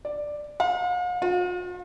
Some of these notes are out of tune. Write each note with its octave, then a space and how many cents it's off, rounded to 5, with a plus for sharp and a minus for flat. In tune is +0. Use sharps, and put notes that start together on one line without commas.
D5 +5
F5 +45
F4 +45